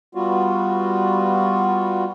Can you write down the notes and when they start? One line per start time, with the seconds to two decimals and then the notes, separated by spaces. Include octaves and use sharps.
0.15 G3 B3 F4 F#4